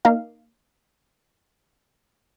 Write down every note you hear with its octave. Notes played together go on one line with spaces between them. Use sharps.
A#3 D#4 A#4 F5